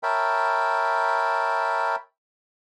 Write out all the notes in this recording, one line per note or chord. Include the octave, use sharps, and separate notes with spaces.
A#4 C#5 E5 G5 A5 B5